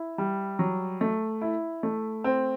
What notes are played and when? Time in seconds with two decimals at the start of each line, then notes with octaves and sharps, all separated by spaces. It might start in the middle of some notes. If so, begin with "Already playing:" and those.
Already playing: E4
0.18 G3
0.59 F#3
1.01 A3
1.42 E4
1.83 A3
2.24 C4